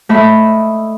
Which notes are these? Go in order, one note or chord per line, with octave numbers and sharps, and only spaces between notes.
A3 D#5 E5 B5 D#6